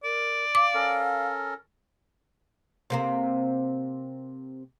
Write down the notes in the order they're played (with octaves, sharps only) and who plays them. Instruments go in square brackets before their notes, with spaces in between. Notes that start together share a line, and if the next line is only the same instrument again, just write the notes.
[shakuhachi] A#4 [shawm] D5
[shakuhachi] F5 [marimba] D6
[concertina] C#4 A4 A#4
[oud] C3 A#3 C4